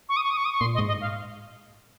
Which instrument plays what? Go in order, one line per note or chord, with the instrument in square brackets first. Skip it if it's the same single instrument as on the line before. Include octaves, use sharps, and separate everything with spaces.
[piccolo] C#6
D#6
C#6
D#6
C#6
D#6
C#6
[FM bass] A#2 [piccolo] C6
[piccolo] D#5
[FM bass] G#2
[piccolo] D#5
F5